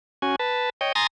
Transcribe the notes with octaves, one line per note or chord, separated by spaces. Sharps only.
C#4 F#4 G#5
B4 A5
C#5 D#5 G5
G#5 A#5 C6 D#6 A6 A#6